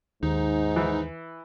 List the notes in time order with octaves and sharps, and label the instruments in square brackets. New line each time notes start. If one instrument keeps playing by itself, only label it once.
[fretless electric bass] D#2 [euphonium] G#2 [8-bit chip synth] D#4
[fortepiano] E3